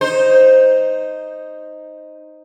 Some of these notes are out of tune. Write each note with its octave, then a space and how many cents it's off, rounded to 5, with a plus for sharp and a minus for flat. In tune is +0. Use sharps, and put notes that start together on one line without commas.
D#4 +0 C5 +0